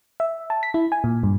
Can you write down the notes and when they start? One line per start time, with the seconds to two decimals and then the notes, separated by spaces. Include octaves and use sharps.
0.20 E5
0.50 A5
0.63 B6
0.74 E4
0.92 G#5
1.04 A#2
1.23 G2